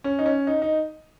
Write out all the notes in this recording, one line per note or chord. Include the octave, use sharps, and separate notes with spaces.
C#4
D#4
C#4
D#4
D#4